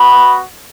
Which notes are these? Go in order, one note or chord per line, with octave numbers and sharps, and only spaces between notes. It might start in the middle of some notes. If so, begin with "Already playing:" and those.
Already playing: B3 F#4 B5